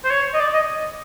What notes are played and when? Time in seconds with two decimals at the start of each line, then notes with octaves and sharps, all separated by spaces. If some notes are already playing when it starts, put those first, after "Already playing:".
0.04 C5
0.11 C#5
0.33 D#5
0.40 D5
0.54 D#5